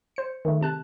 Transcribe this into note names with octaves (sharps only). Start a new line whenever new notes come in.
C5 C#7
D#3 A3
C3 A5 F#6